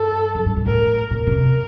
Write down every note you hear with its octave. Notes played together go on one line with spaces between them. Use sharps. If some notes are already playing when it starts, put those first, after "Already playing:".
Already playing: G2 A4
F#2
G2
G#2
A2 A#4
A#2 A#4
B2
C3